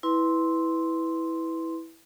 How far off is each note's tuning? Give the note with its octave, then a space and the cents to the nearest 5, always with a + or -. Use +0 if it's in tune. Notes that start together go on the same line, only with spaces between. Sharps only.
E4 -10 B4 +0 C6 +0